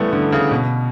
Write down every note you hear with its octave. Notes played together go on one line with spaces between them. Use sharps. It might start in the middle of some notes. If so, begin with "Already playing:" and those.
Already playing: C#3 E3 G3 A3 B3
D3
C#3
B2